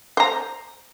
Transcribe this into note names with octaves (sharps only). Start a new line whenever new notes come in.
C5 A#5